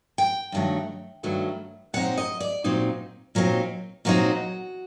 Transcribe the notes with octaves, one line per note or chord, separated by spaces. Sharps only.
G5
G2 D#3 F#3 A3
G2 D#3 F#3 A3
A#2 F#3 C4 D#4 F#5
D#5
D5
A#2 F#3 C4 D#4
A#2 F#3 C4 D#4
A#2 F#3 C4 D#4 F#4